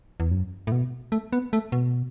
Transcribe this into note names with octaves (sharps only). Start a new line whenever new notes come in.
E2
F#2
A2
B2
A3
B3
A3
B2